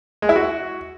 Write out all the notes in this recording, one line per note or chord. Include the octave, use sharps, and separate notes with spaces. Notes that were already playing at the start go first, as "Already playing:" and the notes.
G#3
E4
F#4